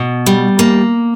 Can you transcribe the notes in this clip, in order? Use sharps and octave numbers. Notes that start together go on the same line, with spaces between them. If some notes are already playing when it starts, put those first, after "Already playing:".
Already playing: B2
G3
A#3